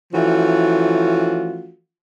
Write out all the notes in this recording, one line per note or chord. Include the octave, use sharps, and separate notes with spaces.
E3 F3 A3 C#4 F4 F#4